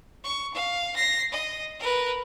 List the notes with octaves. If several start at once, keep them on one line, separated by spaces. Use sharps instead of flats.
C#6
F5
A#6 C7
D#5
A#4 B4